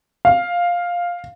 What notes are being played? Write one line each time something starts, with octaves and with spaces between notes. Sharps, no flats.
F5